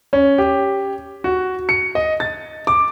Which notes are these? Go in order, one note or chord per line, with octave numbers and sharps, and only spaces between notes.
C#4
G4
F#4
C#7
D#5
A6
D6